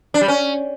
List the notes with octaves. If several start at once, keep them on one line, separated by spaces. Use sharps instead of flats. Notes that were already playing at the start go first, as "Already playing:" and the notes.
D4
G3
C#4